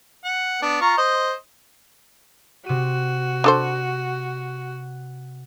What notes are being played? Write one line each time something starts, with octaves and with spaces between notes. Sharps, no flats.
F#5
B3 D4
F4 A#5 C#6
C5 D#5
C3 F#4 D#7
D4 A4 C5